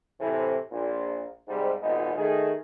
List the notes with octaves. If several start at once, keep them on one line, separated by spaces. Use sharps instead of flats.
A2 C3 E3
A#1 A#2
G#2 C3 G3
G#1 D#2 A#2 G#3 B3 D#4
D#3 A3 G#4